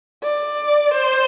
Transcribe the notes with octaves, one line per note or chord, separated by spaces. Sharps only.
D5
C5